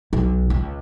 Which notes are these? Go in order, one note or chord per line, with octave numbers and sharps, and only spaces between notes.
B1
C#2